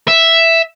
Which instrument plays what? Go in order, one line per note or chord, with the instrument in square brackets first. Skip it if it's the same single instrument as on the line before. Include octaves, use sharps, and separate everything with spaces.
[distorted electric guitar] E5